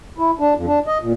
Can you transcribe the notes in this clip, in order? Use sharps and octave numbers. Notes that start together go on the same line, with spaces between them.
E4
D4
F2
D4
D#5
A#2